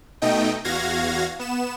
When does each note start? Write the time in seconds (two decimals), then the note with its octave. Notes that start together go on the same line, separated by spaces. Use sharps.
0.22 B2 A3 D#4 D#5 G5
0.64 E2 F#4 F5 G#6 A#6
1.39 B3 E7